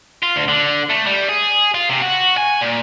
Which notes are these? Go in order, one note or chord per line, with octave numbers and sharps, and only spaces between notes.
F4
D2
D3
A3
G3
G#4
F4
C3
F#4
G#5
A#2